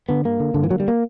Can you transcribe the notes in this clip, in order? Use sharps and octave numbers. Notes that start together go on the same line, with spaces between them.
D3 B3
G2 A#3
D3
G2 D3
E3
D3 F#3
G3
A#3